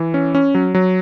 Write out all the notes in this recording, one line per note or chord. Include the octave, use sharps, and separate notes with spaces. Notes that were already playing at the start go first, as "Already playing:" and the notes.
Already playing: E3
C#4
C#4
F#3
F#3